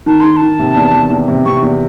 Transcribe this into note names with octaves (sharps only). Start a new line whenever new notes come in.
D#3 A5
D#3 C6
C6
A5
D#3
C3
E2
E2
E2
C3
C3 C#6
E2